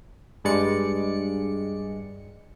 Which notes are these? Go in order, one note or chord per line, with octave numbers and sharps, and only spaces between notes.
G2 G#3 D5 C#7